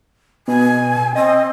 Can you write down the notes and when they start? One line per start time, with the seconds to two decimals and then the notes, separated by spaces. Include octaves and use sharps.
0.48 B2 G#5
1.15 C4 D#5